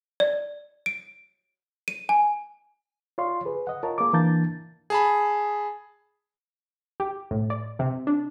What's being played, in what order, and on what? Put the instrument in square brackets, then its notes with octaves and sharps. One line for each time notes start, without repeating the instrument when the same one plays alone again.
[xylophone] D5
D7
D#7
G#5
[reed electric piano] F4 C#5 D5 F5 C6
G#4 B4
D#5 F#5
F4 A#4 C#5 A5
A#3 G#4 D6
E3 A#3 D4 A5 G6 A6
[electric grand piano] G#4 A5 B5
[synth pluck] G4
A2
D5
C3
D4